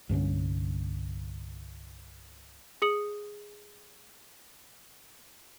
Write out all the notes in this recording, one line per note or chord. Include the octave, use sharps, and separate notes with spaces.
C2 G2 D3 C#4
G#4 D#6 C#7 F#7